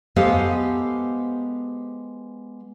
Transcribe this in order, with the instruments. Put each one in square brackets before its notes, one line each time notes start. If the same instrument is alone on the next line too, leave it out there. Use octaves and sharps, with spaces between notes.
[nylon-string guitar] G#3 B3 G4 A4 C5 F5